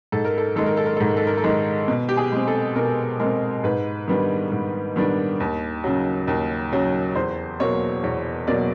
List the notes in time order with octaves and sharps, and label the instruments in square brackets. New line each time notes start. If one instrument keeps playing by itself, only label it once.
[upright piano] G#2 A4
A#4
A4
D#3 G#3 A4
A#4
A4
A#4
G#2 A4
A#4
A4
A#4
A4
D#3 G#3
B2
G4
G#4
G#3 C4
A4
B2 A#4
G#3 C4 A#4
G#2 B4
D#3 G3 B3 D4
G#2
D#3 G3 B3 D4
D#2
C#3 F#3
D#2
C#3 F#3
E2 C5
B2 F#3 A#3 C#5
E2 C#5
B2 F#3 A#3 D5